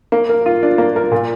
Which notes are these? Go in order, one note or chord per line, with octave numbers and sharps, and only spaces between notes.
A#3
A#4
F4
D4
A#3
A#4
A#2